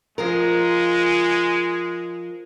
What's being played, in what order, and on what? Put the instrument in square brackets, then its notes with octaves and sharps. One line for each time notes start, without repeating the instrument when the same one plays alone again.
[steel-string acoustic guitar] F3 F4 A#4 [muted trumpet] G#3